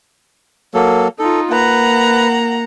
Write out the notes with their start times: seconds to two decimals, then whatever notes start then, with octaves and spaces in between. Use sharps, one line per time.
0.74 F#3 A#3 A4
1.19 D#4 F4 A4
1.51 A#3 B4 F#5 A#5